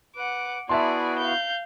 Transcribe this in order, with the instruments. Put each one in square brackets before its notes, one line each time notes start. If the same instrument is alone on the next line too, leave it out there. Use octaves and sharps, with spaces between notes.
[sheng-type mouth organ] B4 [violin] F#5 D6
[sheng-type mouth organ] B3 E4 F#4 [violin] G#4 D5 [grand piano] E5 A5 C6
[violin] F5 G6